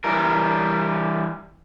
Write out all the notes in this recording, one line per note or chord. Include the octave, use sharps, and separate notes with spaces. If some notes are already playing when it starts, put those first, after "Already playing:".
E3 G3 A#4